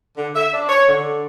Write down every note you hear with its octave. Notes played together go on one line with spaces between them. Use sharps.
D3
E5
D4
C#5
D3